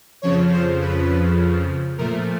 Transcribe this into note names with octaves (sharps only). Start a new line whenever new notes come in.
F2 C#3 F3 C#5
C5
B4
A#2 F3 A3 A#4